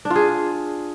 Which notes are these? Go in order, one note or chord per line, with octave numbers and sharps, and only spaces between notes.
D4
F4
G#4